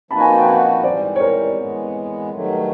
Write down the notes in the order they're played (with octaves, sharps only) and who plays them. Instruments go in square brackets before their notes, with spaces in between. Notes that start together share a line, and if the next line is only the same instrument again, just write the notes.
[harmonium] F3 A#3 D#4 F#4 B4 [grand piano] A5 B5
[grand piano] G#5 A#5
G5 A5
F#5 G#5
[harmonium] G#2 E3 G3 [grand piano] C5 D5
[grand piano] C#5
A#4 C5
[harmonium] E3 G#3 B3
G2 D#3 F#3 A3